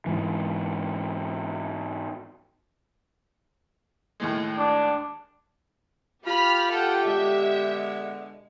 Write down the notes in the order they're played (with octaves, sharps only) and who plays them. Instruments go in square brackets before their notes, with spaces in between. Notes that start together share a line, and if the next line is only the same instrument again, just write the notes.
[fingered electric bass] G#2 E3
[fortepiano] D#2 A2 G#3
[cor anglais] D4
[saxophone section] F4 [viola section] G4 [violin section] B5 F6
[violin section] A4 F#5 G5
[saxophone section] B2 D3 G#3 [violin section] E5